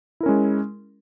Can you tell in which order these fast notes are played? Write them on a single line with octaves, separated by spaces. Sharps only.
E4 A#4 C#4 G#3